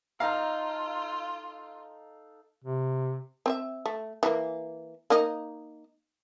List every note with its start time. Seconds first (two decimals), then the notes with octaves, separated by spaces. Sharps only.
0.20 D#4 F4 A4 F5 A#5
2.65 C3
3.46 C4 C#5 E5
3.86 A3
4.23 E3 F#3 A#3
5.10 A#3 D#4 D#5